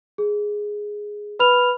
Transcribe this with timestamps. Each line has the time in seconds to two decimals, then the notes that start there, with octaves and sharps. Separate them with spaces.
0.18 G#4
1.39 B4 B5 F6 F7